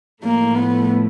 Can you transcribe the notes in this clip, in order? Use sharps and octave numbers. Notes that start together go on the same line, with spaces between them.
A2 F3 A3 A#3
B3